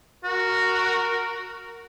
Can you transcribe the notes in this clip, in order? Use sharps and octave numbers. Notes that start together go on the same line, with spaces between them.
F#4 A#4